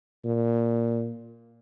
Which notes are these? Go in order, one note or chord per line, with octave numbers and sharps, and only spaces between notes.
A#2